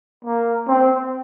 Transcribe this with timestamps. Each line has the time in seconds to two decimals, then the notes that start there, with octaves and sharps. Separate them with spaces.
0.25 A#3
0.68 C4